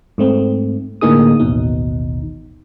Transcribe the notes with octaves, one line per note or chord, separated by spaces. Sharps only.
G#2 A3 C4
A2 D3 A#3 D#4 G#4 D#6
A1 D#2 B2 D#4